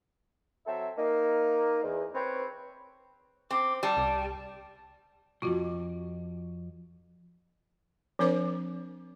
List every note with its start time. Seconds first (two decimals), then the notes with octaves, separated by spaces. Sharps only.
0.66 F#3 C4 A4 E5
0.97 A#3 D#4
1.83 E2
2.14 C4 B4 C#5
3.51 C4 D6
3.83 G3 A5
3.97 C2
5.42 B1 F2 F4 F#4
8.19 F3 C4 D4 A#4 C5 D6